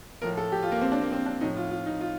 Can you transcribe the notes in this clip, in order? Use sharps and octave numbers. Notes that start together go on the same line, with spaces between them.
A2 F3 A#4
A4
G4
F4
A#3
C4
D4
A#3
C4
D4
A2 F3 D#4
F4
F4
D#4
F4